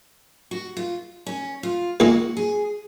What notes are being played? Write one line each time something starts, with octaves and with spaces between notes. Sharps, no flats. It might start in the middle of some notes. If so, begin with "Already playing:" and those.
F#4
F4
C#4
F4
A#2 G#3 D#4 F#4
G#4